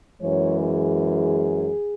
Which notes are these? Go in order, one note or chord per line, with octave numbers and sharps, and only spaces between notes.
F#2 E3 G#3 C#5
G#4